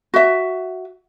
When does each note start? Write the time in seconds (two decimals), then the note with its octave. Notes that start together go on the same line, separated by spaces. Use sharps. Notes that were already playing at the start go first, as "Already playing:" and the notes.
0.14 F#4 E5